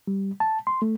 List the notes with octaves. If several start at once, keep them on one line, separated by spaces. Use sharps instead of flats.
G3
A5
C6
A3